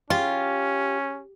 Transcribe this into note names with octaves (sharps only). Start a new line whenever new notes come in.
C#4 F4 G4